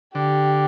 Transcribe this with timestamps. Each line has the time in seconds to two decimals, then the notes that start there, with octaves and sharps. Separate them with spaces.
0.15 D3 G4